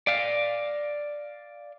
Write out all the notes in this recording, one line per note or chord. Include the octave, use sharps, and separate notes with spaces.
D5 F5